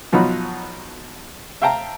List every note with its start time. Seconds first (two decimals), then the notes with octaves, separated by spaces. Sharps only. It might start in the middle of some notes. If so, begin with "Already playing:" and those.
0.12 B2 F3 F#3 D#4 B5
1.62 E5 F5 G5 A5 A#5